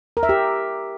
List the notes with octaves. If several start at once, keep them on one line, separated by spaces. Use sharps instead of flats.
A#4
E5
G4